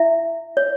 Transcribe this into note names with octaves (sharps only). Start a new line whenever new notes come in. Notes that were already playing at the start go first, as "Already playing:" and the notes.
Already playing: E4 E5
C#5